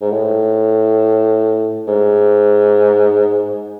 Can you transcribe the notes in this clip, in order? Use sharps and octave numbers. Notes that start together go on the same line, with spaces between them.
G#2
A2
G#2